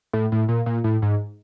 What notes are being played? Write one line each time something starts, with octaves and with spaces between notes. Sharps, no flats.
A2
A2
A#2
A#2
A2
G#2